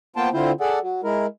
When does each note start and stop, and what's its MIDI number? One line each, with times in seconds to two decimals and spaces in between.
0.16 0.29 58
0.16 0.29 59
0.16 0.29 65
0.16 0.29 72
0.16 0.29 79
0.16 0.29 81
0.33 0.52 50
0.33 0.52 60
0.33 0.52 64
0.33 0.52 65
0.33 0.52 72
0.61 0.79 68
0.61 0.79 69
0.61 0.79 74
0.61 0.79 78
0.82 1.01 54
1.04 1.26 56
1.04 1.26 64
1.04 1.26 70